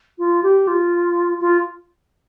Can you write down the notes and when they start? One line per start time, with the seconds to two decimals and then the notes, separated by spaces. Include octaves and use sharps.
0.18 F4
0.43 G4
0.67 F4
1.41 F4